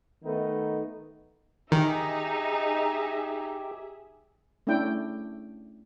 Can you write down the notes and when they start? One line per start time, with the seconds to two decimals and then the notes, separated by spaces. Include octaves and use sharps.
0.24 D#3 A3 B3 D#4
1.72 D#3 D#4 G4 G#4 E5
4.67 A3 C#4 D4 E4 G5